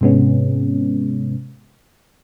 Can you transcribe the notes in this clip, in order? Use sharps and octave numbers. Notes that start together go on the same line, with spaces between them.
G#2 C3 G#3 B3 C#4